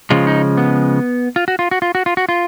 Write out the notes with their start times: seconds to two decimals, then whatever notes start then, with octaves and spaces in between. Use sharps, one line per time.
0.10 C#3 F3 G#3 F4
0.27 D#4
0.57 B3
1.36 F4
1.48 F#4
1.59 F4
1.71 F#4
1.82 F4
1.95 F#4
2.06 F4
2.17 F#4
2.29 F4